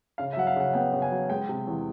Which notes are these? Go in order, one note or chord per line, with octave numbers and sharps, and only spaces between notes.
C#3 F5
E5
F#3 F#5
F5
C#3 F#5
B3 G5
C#3
G#5
F#3
G#3 G5
C3
E2